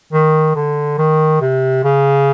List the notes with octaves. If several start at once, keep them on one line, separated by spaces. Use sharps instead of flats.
D#3
D3
D#3
C3
C#3